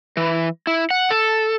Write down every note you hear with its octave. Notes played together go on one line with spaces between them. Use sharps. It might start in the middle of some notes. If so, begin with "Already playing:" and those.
E3
E4
F#5
A4